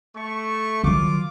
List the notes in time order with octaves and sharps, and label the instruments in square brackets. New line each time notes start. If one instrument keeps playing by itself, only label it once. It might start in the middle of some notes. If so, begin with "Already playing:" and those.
[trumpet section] A3 C#6
[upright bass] D#3 F#3 [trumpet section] F4 D6